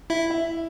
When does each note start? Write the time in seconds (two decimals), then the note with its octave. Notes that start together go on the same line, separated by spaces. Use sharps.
0.10 E4 E5
0.30 E4 E5